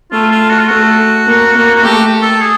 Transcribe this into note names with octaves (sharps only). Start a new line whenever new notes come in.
A3 F4
F4
F#4
F4
A3 F#4
A#3
A#3
F#4
A3 G4
A4
G#4